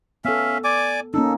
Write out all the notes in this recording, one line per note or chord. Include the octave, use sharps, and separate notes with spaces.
B3 C#4 A4 E5 F5
D5 G#5 D6
A#3 C#4 D#4 A4